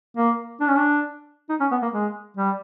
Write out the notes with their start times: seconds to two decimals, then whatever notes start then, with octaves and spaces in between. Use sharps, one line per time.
0.17 A#3
0.61 D4
0.68 C#4
0.77 D4
1.49 D#4
1.60 C#4
1.71 B3
1.82 A#3
1.93 G#3
2.37 G3